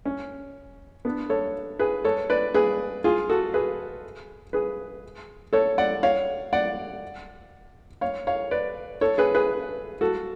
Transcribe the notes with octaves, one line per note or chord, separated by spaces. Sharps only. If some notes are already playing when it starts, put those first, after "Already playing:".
C#4
B3 D4
A4 C#5
G#4 B4
A4 C#5
B4 D5
G#4 B4
F4 G#4
F#4 A4
G#4 B4
G#4 B4
A4 C#5
D5 F#5
C#5 F5
D5 F#5
C#5 F5
C#5 F5
B4 D5
A4 C#5
G#4 B4
G#4 B4
F#4 A4